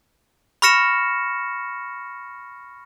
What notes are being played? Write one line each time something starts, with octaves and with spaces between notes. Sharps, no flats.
B5 C#6 F6 A#6 C#7 E7